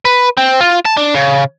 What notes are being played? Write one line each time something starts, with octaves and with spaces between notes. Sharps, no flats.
B4
C4
F4
A5
D4
C#3